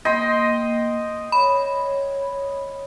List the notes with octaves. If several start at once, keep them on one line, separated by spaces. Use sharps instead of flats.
A#3 D#5 G5 C6
C#5 B5